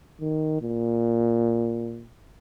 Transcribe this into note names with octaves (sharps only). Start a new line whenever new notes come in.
D#3
A#2